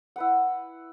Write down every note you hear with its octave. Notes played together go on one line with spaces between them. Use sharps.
E4 B4 F#5